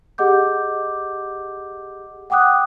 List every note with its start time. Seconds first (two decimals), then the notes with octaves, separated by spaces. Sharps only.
0.18 G4 G#4 D#5 F#5 D6 G6
2.30 F#5 G5 D6 D#6 F#6